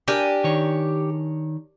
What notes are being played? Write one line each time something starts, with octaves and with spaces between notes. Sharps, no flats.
D4 G4 A#4 G#5
D#3 C#5